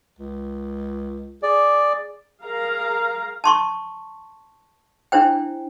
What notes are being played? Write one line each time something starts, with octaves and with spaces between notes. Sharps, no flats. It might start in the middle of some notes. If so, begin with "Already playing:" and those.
C#2
G#4 D5
G#4 A#4 F5 A#5
A5 C6 C#6
D4 E4 C5 G5